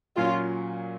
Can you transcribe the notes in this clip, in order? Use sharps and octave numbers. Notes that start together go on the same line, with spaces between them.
A#2 F#3 C#4 F4